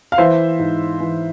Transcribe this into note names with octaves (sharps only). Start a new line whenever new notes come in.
F5
E3 C5 E5
G#2
E3